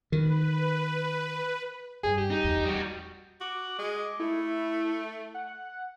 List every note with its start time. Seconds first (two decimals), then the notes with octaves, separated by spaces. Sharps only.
0.12 D#3 B4
2.03 G2 G#4
2.18 G4
2.30 D#4
2.44 E2
2.65 G3 F#4
3.41 F#4 D6
3.79 G#3
4.20 A3 E4
5.34 F#5